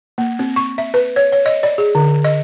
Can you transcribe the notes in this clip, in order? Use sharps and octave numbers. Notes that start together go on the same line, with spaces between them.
A#3
C4
C#6
E5
B4
C#5
C#5
D#5
D5
G#4
D3
D#5